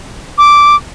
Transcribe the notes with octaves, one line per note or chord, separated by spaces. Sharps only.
D6